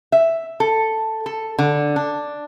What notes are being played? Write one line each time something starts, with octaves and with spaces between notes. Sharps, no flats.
E5
A4
A4
D3
D4